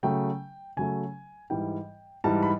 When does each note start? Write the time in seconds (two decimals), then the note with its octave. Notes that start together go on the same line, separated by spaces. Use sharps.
0.03 C#3 F#3 A3 G5
0.77 C#3 F#3 A3 G#5
1.50 G#2 E3 G3 G5
2.24 G#2 E3 G3 A5
2.43 B5